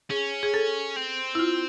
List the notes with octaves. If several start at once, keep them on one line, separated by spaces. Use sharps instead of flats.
C#4 G#4
G#4
A4
C4
E4
F4